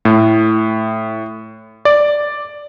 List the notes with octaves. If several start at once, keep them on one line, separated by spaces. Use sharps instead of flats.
A2
D5